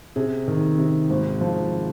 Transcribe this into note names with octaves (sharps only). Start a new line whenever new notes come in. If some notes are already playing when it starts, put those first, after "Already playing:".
C3 G#4
D#3
C3
G#1
F3